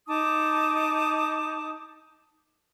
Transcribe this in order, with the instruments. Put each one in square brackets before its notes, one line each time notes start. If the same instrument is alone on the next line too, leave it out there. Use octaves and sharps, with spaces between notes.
[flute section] D#4 A5 D6 D#6